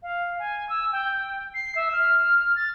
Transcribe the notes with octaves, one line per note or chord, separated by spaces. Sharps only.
F5
G#5
E6
G5
C7
E5
F6
A6